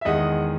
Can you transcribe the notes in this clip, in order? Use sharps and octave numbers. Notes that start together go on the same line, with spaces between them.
E5
E2 D#3 G#3 D#5 F#5